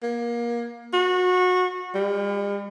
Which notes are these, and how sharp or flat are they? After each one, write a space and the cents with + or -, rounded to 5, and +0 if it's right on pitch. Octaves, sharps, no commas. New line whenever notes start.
A#3 +25
F#4 -25
G3 +45